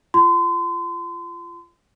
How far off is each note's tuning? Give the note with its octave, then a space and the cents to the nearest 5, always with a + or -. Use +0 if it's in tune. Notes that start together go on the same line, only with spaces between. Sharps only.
F4 -20 C6 -35